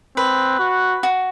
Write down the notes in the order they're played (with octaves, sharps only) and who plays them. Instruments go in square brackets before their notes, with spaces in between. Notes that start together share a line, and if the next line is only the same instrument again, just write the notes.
[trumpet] C4 [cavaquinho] B4
[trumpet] F#4
[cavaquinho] F#4